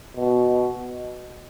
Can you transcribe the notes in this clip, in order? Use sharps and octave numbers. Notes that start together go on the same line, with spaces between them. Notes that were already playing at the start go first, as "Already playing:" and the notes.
B2